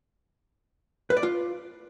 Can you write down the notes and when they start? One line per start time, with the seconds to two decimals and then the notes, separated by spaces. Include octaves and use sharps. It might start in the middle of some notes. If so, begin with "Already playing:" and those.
1.10 B4
1.17 D5
1.23 F4